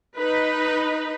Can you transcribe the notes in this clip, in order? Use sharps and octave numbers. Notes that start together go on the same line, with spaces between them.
D#4 B4